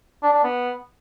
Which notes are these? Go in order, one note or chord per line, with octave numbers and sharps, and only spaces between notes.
D4
D4
B3